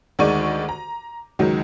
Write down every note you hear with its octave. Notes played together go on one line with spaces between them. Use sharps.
D2 D#3 G#3 D5 C#6 D#7
A#5
C#2 D#3 F#3 G#3